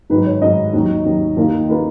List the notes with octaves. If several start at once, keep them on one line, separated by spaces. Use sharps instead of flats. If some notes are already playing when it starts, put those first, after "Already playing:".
G#2 D#3 F#3 B4
C#5
G#2 D#3 F#3 D#5
D#2 D#3 F#3
D#2 D#3 F#3
D#2 D#3 A#3 F4
D#3 A#3 F4 B4